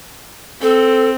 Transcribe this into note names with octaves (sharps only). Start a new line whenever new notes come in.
C4 A4